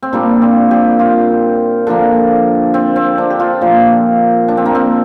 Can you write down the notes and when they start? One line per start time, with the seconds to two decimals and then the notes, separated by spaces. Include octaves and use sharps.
0.02 C4
0.13 A#2 G3 A#3 D4
0.42 C4
0.71 G4
0.99 F4
1.87 D3 F3 A#3 D4
2.74 C4
2.96 C4
3.18 D4
3.30 G4
3.40 F4
3.61 A#2 F3 A#3
4.48 D4
4.57 C4
4.65 A#3
4.75 C4